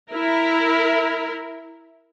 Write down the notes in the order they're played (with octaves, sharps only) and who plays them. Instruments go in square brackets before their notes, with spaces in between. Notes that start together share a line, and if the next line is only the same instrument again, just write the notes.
[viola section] E4 A#4